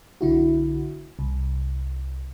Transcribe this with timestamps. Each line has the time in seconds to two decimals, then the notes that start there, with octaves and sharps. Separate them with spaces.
0.21 B1 D3 E4 F#4
1.19 C2